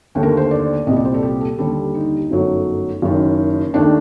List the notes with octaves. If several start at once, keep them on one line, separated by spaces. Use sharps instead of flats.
D#2 D3 A3
A#4
C5
D5
C2 A#2 G3 D#5
D5
C5
A4
G4
A4
D#2 D3 G3 A4
D#4
G1 F#2 F#3 A3
F#1 F#2 D#3
D#2 D#3 A3 D4